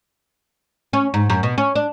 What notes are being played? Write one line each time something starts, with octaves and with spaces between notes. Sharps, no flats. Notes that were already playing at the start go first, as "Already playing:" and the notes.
C#4
G#2
F#2
B2
C#4
D4